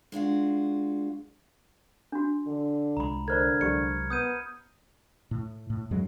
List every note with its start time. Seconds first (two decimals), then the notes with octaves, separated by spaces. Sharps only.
0.12 G#3 D4 F4 F#4
2.12 D4 F#4
2.47 D3
2.97 C2 G#3 A#5 B5
3.28 D3 A#4 C5 D5 F6 G#6
3.61 C2 F#3 G#3 G4 D5 C#7
4.10 B3 D#6 G6 D#7
5.31 A2
5.70 A2
5.91 F2 F#3 G#3